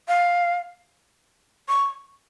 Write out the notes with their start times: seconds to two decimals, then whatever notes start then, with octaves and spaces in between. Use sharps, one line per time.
0.08 F5
1.68 C#6